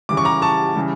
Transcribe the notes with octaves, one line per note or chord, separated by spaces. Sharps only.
C#3 E3 G3 D6
C#6
A#5 D6
A5 C#6
C#3 E3 G3